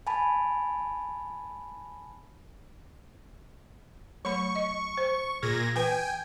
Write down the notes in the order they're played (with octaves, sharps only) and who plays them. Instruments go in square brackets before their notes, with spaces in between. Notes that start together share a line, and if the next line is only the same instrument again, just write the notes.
[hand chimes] G#5 A5 B5
[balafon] F#3 A3 B5 [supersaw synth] C#6
[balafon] D#5
C5
[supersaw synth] A#2 G#6 A#6 [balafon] G#4
[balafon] E3 B4 [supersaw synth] G5 G#5